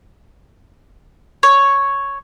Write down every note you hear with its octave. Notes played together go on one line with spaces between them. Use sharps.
C#5